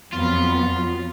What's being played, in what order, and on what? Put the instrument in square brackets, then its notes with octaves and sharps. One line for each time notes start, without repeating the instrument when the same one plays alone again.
[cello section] F2 F#3 B3 [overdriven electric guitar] F4